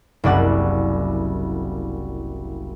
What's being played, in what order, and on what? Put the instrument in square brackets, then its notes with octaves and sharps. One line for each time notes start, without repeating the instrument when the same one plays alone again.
[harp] F#1 C2 D5 F#5